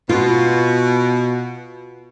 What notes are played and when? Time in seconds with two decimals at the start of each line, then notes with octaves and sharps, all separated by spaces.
0.09 B2 F4